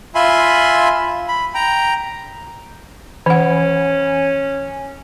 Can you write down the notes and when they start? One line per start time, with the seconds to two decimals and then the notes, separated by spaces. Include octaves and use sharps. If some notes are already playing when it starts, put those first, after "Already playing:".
0.15 F4 E5 G#5 B5 C6
1.28 B5
1.55 G5 A#5
3.26 E3 C#4 F#5